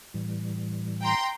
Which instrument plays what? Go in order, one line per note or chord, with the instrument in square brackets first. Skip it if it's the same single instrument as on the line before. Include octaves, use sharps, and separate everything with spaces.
[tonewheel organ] A2 E3 G3
[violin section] G5 A#5 C6